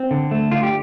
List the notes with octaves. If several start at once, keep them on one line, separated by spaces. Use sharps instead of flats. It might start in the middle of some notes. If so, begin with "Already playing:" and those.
Already playing: C4
D3
A3
D3 F4
G4